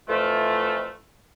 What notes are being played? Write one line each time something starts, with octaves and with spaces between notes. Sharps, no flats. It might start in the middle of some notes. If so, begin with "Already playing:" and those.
F2 E3 A3 F4